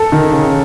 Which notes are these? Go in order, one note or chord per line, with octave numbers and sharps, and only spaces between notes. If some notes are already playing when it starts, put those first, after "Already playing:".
Already playing: A4
D#3
C#3